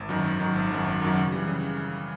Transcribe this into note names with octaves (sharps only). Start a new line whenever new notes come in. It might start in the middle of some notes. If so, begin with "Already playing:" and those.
Already playing: G#1
F#2 D#3 F#3
G#1
F#2 D#3 F#3
G#1
F#2 D#3 F#3
G#1
F#2 D#3 F#3
C#3
E3 G3
C#3